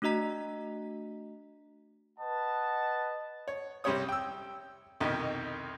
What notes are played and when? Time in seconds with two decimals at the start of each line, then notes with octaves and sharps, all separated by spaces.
0.02 A3 D4 F#4 D#5 A#5 B6
2.19 B4 D#5 F#5 A5
3.48 C#5
3.84 C2 G3 C4 G4 C#5 D#6
4.09 G5 E6
5.01 C2 F2 B2 D#3